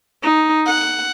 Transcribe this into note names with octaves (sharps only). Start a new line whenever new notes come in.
D#4
F#5